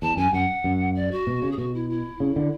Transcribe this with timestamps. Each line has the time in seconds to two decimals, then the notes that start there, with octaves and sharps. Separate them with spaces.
0.02 E2 A5
0.17 F#2 G#5
0.33 F#2 F#5
0.64 F#2
0.95 D5
1.11 F#4
1.27 B2
1.42 C#3
1.52 G#4
1.57 B2 F#4
1.74 E4
1.90 E4
2.20 C#3
2.36 D3